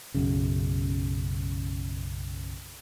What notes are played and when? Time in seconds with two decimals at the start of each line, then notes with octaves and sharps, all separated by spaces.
0.14 B1 F#2 C#3